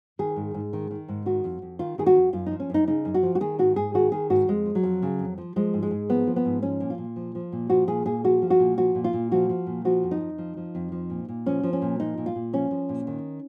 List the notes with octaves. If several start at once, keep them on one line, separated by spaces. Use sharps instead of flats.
D#3 G#4
G#2
G#2
D#3
D#3
G#2
D#3 F#4
F2
F2
D#3 F4
D#3 G#4
F#4
F2
F#2 F4
F3 D#4
C#4
F#2 D#4
C#3 D#4
F#2
F#4
F3
F#4
D#3 G#4
G#2 F#4
G#2 G#4
D#3 F#4
D#3 G#4
G#2 F#4
F2 G#3
F3
F#3
F2
C#3
F2
F3
F3 G#3
G#2
G#3
G#2
F3 B3
F3
B3
G#2
F3 C#4
A#2
F4
A#2
F3
F3
A#2
F3 F#4
A#2 G#4
A#2 G#4
F3 F#4
F3
F#4
A#2
F3 F#4
A#2
F4
A#2
F3 F#4
F3
A#2
F3 F#4
F2
D#4
F2
F3
F3
F2
F3
A#2
A#2
F3 C#4
F3
C#4
A#2
F3 D#4
A#2
F4
A#2
F3 C#4
F3
A#2
D#3